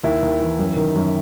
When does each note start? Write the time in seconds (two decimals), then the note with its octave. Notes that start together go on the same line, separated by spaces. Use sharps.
0.04 D#2 E4
0.23 D#2
0.41 E3
0.59 F#2
0.77 D#3
0.96 F#2